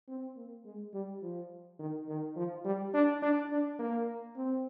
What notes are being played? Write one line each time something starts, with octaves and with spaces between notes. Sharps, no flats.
C4
A#3
G#3
G3
F3
D#3
D#3
F3
G3
D4
D4
D4
A#3
C4